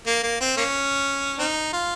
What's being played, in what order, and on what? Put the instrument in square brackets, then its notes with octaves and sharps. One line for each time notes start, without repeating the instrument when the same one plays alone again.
[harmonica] A#3
A#3
C4
A#3 C#4
C4 D#4
F4